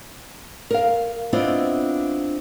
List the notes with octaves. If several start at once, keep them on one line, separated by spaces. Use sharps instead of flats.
A#4 F5
B3 C4 D4 E4 F4 D#5